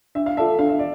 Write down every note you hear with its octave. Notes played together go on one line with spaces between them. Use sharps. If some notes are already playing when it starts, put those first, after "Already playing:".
D4 E5
F5
F4 A4 D5 E5 A5
D4 F5
E5
D5